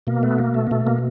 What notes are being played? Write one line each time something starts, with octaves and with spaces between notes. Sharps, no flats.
B2 A#3
A3 B3
A#3
A3
A#3
B2 A3
A#3